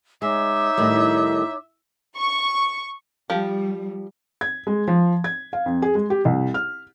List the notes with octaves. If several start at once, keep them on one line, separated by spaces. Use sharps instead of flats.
G#3 D#4 C#5 E5 D6
A2 D#3 G3
C#6
F3 G3 G4
G#6
G#3
F3
G#6
F5
F2
G#4
G#3
G4
C2
F6